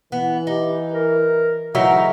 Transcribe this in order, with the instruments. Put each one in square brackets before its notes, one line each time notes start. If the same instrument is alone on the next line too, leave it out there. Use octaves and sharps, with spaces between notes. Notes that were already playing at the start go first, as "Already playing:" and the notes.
[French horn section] E3 [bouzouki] B3
[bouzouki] D#4 [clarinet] G4
[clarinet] A#4
[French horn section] A2 E3 [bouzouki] C#3 D#4 A#4 [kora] F#3 [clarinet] E5